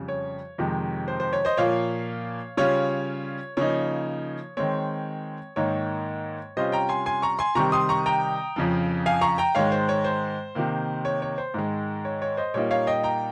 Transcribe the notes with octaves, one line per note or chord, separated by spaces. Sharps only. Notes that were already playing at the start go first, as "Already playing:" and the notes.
Already playing: F2 C#3 G3
C#5
F2 C3 D#3 G#3
C5
C5
C#5
C5 D#5
A#2 F3 A#3 C#5 F5
C#3 G3 C#4 F4 C#5
C#3 F3 A#3 D#4 C#5
D#3 G#3 C4 C#5
G#2 D#3 A#3 D#4 C#5
C3 G3 C#4 F4 C5 D#5
G5 A#5
G#5 C6
G#5 C6
A#5 C#6
G#5 C6
C3 D#3 G3 C4 A#5 C#6
C6 D#6
A#5 C#6
G5 A#5
F2 C#3 F3
F5 G#5
A#5 C#6
G5 A#5
G#2 D#3 G#3 C#5 F5
C5
C#5
C5
C3 D#3 A#3
C#5
C#5
C5
G#2 D#3 G#3
C#5
C#5
C5 D#5
A#2 G3 A#3 D#4 C#5
C#5 F5
D#5 G5
G5 A#5